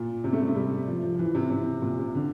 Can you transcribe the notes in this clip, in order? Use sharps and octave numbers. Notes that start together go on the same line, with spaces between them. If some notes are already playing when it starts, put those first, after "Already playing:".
Already playing: A#2
C3
A3
G3
A3
G3
F3
F3
F3
E3
C3
C3
A#2
C3
D3